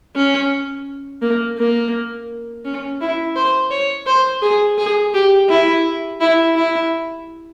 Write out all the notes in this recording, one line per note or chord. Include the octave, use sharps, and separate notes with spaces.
C#4
A#3
A#3
C#4
E4
C5
C#5
C5
G#4
G#4
G4
E4
E4
E4